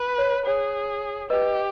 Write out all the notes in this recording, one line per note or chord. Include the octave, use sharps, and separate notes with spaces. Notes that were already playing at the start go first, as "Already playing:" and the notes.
Already playing: B4
C#5
G#4 C#5
G4 B4 D#5